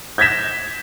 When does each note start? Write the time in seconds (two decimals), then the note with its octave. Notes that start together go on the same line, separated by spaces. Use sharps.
0.18 G6 G#6 A#6 B6 E7